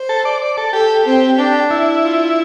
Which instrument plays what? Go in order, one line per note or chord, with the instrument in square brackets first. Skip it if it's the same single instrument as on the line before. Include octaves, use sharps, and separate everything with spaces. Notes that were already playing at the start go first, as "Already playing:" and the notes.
Already playing: [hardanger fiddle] C5
[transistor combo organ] A4
D5
D5
A4
[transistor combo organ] G4 [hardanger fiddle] A4
[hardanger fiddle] C4
D4
[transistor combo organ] E4
[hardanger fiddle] F4